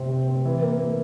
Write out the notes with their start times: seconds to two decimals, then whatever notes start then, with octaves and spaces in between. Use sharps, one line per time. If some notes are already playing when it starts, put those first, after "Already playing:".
Already playing: C3 C4
0.10 C4
0.28 C4
0.45 E3
0.62 A#3
0.79 A#3